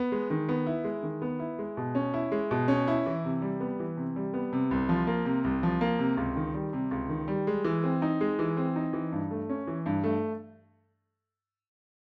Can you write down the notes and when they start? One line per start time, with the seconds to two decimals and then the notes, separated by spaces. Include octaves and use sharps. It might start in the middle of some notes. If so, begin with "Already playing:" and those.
Already playing: B3
0.12 G#3
0.30 D#3
0.49 B3
0.66 E4
0.84 G#3
1.03 D#3
1.22 B3
1.39 E4
1.59 G#3
1.77 B2
1.95 C#4
2.14 E4
2.32 G#3
2.51 B2
2.68 C#4
2.87 E4
3.06 E3
3.24 C3
3.42 G3
3.60 B3
3.80 E3
3.97 C3
4.16 G3
4.34 B3
4.53 C3
4.71 C2
4.89 F3
5.07 A#3
5.25 C3
5.44 C2
5.63 F3
5.81 A#3
5.99 C3
6.17 C#2
6.36 D#3
6.54 G3
6.73 C3
6.91 C#2
7.09 D#3
7.28 G3
7.47 G#3
7.64 E3
7.84 C4
8.02 D#4
8.21 G#3
8.39 E3
8.57 C4
8.76 D#4
8.93 E3
9.12 G2
9.31 A3
9.49 C#4
9.67 E3
9.86 G2
10.04 A3